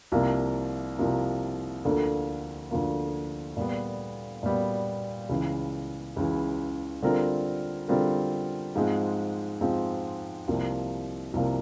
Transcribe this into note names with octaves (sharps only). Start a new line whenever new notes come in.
C2 C3 F3 A#3
C2 C3 F3 A#3
D2 D3 F3 A#3
D2 D3 F3 A#3
A#2 G3 B3
A#2 G3 B3
C#2 C#3 E3
C#2 C#3 E3
D3 G3 C4 F4 A#4
D3 G3 C4 F4 A#4
G#2 F3 G#3 C4
G#2 F3 G#3 C4
C2 C3 F3 A#3
C2 C3 F3 A#3